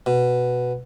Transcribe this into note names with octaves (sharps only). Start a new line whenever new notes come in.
B2